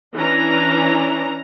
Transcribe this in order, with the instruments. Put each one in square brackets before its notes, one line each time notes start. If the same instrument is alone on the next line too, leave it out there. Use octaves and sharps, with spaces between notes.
[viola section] E3 C#4 D4 A#5